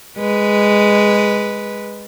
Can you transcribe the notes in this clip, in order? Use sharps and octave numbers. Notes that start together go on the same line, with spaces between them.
G#3 B4